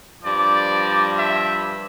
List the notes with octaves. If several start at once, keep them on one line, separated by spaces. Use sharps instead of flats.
G2 F3 D5
E5